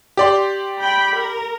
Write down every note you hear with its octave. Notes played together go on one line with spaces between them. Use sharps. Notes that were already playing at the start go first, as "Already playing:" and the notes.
G4 D5 C6
G5 B5
A#4